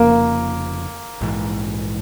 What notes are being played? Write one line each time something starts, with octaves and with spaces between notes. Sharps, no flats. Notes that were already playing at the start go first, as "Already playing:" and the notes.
Already playing: F1 F2 C#3 F3 A#3
A#1 G#2 E3